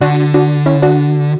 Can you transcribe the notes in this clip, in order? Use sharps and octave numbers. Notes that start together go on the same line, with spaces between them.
D3 D4 F#4
D4 F#4
C#4 E4
D4 F#4